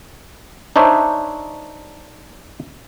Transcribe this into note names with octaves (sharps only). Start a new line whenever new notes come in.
D4 D#4 C5 C#5 E5